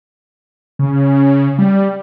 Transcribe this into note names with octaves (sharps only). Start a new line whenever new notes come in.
C#3
G3